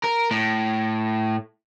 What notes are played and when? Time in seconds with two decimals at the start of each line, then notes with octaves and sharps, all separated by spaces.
0.04 A#4
0.31 A2